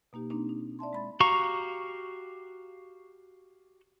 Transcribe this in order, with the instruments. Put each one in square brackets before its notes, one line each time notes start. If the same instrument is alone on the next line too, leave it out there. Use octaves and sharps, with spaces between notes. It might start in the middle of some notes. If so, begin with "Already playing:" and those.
[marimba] B2 A#3 D#4 G4
A#3 C4 D4 D#4
D#4
D5 E5 A5 C6
G#3 B5 A6
[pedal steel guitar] F#4 G4 F5 A#5 C#6